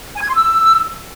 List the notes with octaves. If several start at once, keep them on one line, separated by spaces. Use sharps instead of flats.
G#5
G#6
C6
E6